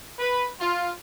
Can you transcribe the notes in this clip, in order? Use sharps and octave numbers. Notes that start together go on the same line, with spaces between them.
B4
F4